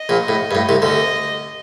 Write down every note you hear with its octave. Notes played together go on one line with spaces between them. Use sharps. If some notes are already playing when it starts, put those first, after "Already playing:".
Already playing: D#5
A#1 A#2
A2
G2
A2
C2 C3
D2 D3 D#5